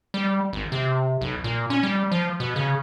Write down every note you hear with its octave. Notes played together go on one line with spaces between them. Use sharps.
G3
G#1
C3
B1
A#2
C#4
G3
F3
B2
C#3